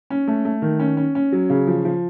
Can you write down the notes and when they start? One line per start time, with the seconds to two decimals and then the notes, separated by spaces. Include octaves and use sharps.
0.10 C#4
0.28 A3
0.45 A3
0.62 D#3
0.80 C#4
0.97 C#4
1.15 C#4
1.32 F#3
1.50 C#3
1.67 F3
1.85 F3